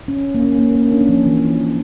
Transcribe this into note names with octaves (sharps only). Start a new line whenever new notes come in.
C#4
A#3
C#4
A#3
A#3
C#4
D4
C#4
F3
E3